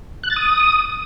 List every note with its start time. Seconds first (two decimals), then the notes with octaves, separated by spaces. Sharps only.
0.23 F#6
0.30 A6
0.36 D#6